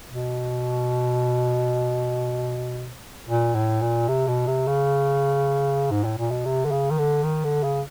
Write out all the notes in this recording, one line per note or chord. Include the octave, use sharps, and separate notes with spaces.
B2
A#2
A2
A#2
C3
B2
C3
C#3
G#2
A2
A#2
B2
C3
D3
C#3
D#3
D3
D#3
D3
C#3